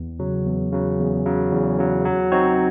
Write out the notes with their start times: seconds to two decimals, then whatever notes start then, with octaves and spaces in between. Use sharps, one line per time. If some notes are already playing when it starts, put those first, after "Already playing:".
Already playing: E2
0.19 C#3 F#3
0.46 E2
0.72 C#3 F#3
0.99 E2
1.26 C#3 F#3
1.52 E2
1.79 C#3 F#3
2.05 F#3
2.32 C4 D#4 F#4 C#5